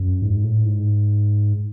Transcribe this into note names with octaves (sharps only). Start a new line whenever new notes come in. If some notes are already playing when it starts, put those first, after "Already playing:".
Already playing: F#2
G#2
A2
G#2